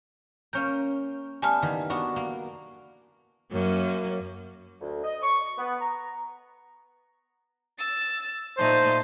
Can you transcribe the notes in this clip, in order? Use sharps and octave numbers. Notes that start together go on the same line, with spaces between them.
A#3 C#4 A#4 G6
G3 A3 B3 G#5 A5 F6
D#3 E3 A#3
B3 D4 F#4
A#3
F#2 A#3 C#4
D2
D#5
C#6
B3
A#5
E6 A6
A#2 A3 D#4 C5